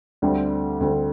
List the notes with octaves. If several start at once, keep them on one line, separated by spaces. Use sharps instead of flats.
D2 D3 G3 C4
D2 D3 G3 C4